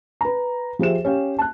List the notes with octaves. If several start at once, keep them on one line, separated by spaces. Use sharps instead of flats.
B4 A#5
F3 G4 G#4 C5 E5 E7
C#4 G4 F5
A5 F#6